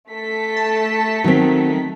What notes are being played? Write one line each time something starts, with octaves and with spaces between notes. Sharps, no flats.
A3 A4 B6
A5
D#3 F#3 C4